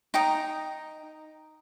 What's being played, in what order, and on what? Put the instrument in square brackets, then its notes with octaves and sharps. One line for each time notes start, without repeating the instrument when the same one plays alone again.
[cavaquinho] D#4 G5 A#5 D#6